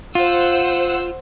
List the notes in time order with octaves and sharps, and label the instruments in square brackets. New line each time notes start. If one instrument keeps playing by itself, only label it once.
[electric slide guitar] F4 [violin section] C5 F#5 E6